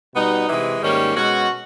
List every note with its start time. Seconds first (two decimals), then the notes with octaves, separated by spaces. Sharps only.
0.13 B2 G3 B3 D#4
0.47 C3 E3 G#3
0.81 G#2 D#3 G3 A#3 C#4
1.14 B2 G#3 C#4 F#4